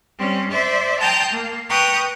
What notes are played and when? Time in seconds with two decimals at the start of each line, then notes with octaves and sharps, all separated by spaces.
0.19 G3 C4 C#4
0.51 C5 D5 E5
1.00 G5 A5 A#5 C6 D#6 G6
1.32 A#3
1.69 B4 G5 A#5 C#6 D#6 F#6